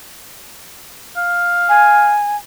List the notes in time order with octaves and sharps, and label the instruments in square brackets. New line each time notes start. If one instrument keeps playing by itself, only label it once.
[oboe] F5
[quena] G#5